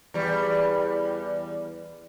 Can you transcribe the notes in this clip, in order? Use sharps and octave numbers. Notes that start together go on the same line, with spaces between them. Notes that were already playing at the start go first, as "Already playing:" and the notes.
E2 G3